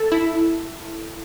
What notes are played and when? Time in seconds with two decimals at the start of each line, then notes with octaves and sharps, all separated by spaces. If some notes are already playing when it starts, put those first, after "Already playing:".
Already playing: A4
0.12 E4